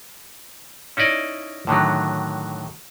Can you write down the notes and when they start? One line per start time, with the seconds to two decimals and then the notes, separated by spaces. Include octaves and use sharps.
0.97 C#4 D#4 E4 D5 D#5
1.67 A2 D3 D#3 F#3